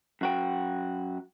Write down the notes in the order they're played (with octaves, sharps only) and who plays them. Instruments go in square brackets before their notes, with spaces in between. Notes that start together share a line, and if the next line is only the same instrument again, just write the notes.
[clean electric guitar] F#2 F#4 G5